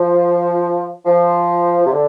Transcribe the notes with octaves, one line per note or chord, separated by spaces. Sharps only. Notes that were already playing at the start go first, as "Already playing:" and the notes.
Already playing: F3
F3
C3
D3